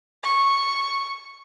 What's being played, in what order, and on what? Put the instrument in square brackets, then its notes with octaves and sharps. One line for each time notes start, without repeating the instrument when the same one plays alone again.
[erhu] C#6